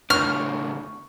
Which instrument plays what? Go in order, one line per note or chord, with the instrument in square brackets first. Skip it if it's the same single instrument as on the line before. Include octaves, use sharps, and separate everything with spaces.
[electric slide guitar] A2 C#3 D4 [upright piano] C#6 [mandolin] F6